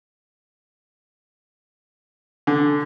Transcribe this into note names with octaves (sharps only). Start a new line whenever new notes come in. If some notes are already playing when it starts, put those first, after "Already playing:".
D3